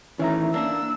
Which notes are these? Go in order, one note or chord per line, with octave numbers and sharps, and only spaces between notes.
D#3 E3 A3 C#4 E5 A#5
A#3 D4 A#4 E6